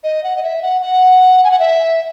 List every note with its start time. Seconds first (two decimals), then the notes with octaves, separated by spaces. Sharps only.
0.04 D#5
0.24 F#5
0.36 D#5
0.43 E5
0.62 F#5
0.82 F#5
1.44 G#5
1.51 F#5
1.59 E5